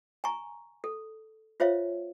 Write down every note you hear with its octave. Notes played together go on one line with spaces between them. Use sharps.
G#5 A#5 C#6
A4
F4 C5 C#5 E5 F5